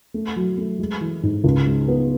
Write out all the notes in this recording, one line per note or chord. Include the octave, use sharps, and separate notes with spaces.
A3
F#3
A3
G#3
E3
G#2
C#2
G#3
B3